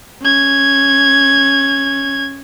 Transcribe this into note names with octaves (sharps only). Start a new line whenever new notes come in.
C#4 G#6